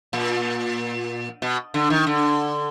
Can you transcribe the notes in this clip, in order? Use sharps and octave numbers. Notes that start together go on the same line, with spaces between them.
A#2
B2
D3
D#3
D3